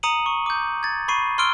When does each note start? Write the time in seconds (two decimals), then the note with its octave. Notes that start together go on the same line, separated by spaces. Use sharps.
0.03 A#5 D#6 C#7 D#7 F#7
0.26 C#6
0.46 D6 G6
0.83 G#6 A6
1.08 B5 C#6 C7 D#7
1.38 C6 E6 F6 D7 G7